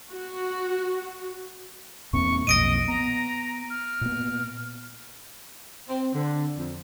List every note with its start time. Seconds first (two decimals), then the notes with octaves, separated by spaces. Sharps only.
0.12 F#4
2.13 E2 A#2 C4 C#6
2.47 B1 F2 A#2 D#5 A#6 D7 D#7
2.88 B3 A#5
3.70 F6
4.01 A#2 B3
5.89 C4
6.14 D3
6.58 F2